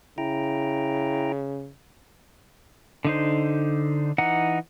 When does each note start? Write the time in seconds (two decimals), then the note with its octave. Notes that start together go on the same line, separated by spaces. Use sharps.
0.18 C#3 E4 G5 A#5
3.05 D3 D#4 C5
4.18 E3 D#4 F#5